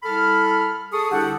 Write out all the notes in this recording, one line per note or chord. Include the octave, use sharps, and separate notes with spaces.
C2 A4 B5 F6
G#4 A4 C#6 D#6
C2 D3 D4 G4 A4 F#5